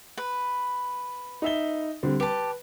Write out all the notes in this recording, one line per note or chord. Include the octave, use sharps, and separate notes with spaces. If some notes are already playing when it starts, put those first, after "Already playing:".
B4
D#4 E5 G7
D3 G3 C4
G4 B4 A5